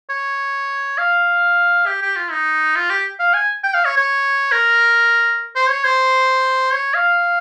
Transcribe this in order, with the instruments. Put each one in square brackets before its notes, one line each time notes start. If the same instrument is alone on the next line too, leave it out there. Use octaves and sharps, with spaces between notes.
[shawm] C#5
F5
G4
G4
F4
D#4
F4
G4
F5
G#5
G5
F5
C#5
C#5
A#4
C5
C#5
C5
C#5
F5